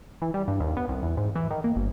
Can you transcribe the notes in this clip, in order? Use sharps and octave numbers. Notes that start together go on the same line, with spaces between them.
E3
G3
G2
D#2
B3
C2
E2
G#2
E3
D#3
A#3
G1